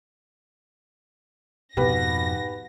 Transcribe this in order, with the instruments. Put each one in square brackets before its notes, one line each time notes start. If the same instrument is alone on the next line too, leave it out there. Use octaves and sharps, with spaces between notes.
[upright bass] F2 B2 [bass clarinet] G#2 [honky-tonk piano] G4 B4 [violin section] A#6